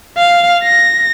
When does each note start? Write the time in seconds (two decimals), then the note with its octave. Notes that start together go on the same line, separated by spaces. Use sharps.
0.17 F5
0.63 A#6